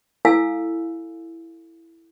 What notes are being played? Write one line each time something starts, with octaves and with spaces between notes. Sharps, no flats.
E4 A4 F5 G#5 E6